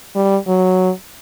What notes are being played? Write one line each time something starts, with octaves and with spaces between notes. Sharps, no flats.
G3
F#3